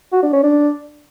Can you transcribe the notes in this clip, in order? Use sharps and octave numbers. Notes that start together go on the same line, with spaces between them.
F#4
D4
C#4
D4